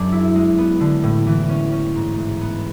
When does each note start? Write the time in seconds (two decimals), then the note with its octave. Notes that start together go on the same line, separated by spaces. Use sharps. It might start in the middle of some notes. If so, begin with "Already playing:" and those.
Already playing: F#2 D4 G#4
0.12 E4
0.35 G#3
0.58 B3
0.80 D3
1.04 A2
1.27 E3
1.49 C#4
1.72 C#4
1.95 G#2
2.18 G#2
2.41 B3